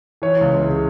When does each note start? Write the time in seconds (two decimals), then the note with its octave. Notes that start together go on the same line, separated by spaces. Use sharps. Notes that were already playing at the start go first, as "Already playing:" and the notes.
0.22 E3 C#5
0.41 C#2
0.60 C#3